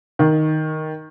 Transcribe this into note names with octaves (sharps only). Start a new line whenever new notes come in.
D#3